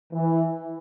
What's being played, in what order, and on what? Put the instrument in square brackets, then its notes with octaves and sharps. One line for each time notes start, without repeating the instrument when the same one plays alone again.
[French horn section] E3